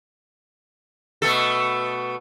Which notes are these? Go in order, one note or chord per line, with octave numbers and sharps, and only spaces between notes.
B2 A3 A4